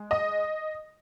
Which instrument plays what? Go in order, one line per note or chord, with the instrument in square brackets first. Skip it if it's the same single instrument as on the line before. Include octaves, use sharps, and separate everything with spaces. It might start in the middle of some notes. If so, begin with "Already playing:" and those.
Already playing: [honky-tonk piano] G#3
D#5